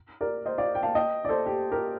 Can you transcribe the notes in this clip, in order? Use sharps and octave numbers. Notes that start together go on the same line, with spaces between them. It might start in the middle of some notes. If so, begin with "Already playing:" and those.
A#4 D5
C5 D#5
D5 F5
G5
F5 A5
D#5 G5
D5
A4 C5
G4
G4 A#4